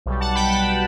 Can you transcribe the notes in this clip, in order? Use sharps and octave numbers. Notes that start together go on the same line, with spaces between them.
B1 B2 G3
F#5 A5
G5 B5
A5
G5 B5